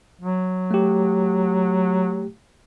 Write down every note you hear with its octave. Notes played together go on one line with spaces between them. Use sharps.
F#3
A3 G4